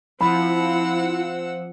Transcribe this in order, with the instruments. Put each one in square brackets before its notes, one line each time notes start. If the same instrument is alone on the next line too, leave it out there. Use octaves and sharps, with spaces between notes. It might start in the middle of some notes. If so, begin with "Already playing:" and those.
[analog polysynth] F3 [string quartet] C4 F#5 E6 [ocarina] E4 [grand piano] B5